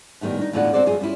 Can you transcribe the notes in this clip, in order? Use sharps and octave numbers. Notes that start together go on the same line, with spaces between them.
F#2 A2 D#3 G3 B3
D4 D#4
E2 A2 D3 F4 D5 F#5
C4 F#4 A4 C5 D5
F#2 F4 G#4
G3 B3 C#4 E4 F4